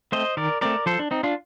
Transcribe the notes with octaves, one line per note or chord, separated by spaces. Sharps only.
A3 C4 C5 D#5
D#3 A#4 D5
A3 C4 A#4 D5
F3 A4 C5
D4
C4 D#4
D4 F4